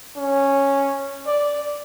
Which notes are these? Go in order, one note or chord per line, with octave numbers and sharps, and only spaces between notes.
C#4
D5